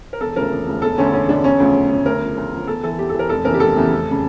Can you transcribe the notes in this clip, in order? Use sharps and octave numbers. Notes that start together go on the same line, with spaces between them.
A#4
E1 A4
D2 C#3 F3 A#4
E1
D2 C#3 F3
E1 A4
D2 D3 C#4
E1 C#4
D2 D3 D4
E1 C#4
D2 C#3 F3
E1
D2 C#3 F3
D2 A#4
C#3 F3
D2
C#3 F3
E2 A4
E3 A4
E2 G4
A4
E3
A#4
F1 A4
E2 C#3 E3 A#4
G4
F1 A4
E2 C#3 E3
F1
C#3